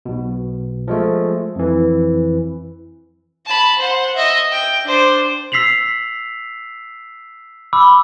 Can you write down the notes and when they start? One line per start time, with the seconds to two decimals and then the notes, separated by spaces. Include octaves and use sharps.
0.05 B1 B2
0.88 F3 G#3 A3
1.56 F2 E3
3.46 A5 B5
3.78 C5 F#5
4.16 D#5 E5
4.52 G5
4.84 D4 C5
5.52 E6 B6 C7 F7 F#7
7.73 B5 D6 E6